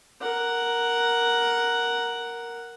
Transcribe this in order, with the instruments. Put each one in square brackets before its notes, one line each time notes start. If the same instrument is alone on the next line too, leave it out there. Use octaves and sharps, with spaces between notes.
[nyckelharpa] A#4 F#5